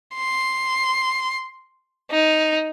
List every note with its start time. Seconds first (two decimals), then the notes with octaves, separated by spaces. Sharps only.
0.15 C6
2.11 D#4